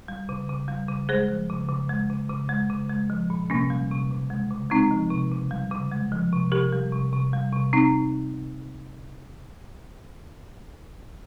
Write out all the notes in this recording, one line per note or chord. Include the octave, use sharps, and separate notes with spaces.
G3
C#3
C#3
G3
C#3
G#3 G#4 C5
F3
C#3
C#3
G#3
C#3
C#3
G#3
C#3
G#3
F3
A#2
C3 A#3 C#4
G3
C3
C#3
G#3
C#3
G#3 C4 D#4
F3
C3
C#3
G3
C#3
G#3
F3
C3
C3 G4 A#4
G3
C3
C3
G3
C3
C4 D#4